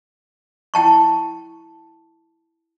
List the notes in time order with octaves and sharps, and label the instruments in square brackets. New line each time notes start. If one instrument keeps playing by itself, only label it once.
[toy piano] E4 G5 A5 C#6